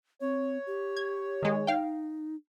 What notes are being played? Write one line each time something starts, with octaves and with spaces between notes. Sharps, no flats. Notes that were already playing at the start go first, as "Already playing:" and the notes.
C4 C#5
G4
G#6
D#3 G#3
D#4 F5 G5